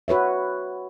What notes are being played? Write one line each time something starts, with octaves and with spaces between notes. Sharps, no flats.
F#4 B4 C#5 E5